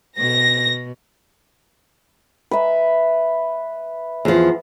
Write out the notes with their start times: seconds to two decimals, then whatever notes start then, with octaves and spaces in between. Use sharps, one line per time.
0.18 B2 A#6
2.51 B4 E5
4.25 E2 F3